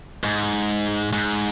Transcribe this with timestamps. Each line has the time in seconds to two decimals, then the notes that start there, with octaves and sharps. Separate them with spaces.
0.24 G#2
1.13 G#2